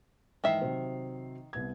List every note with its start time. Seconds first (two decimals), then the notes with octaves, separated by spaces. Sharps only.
0.44 G#2 D#3 E3 E5 C7
0.62 C3 F#3 C4
1.53 C2 B3 G#6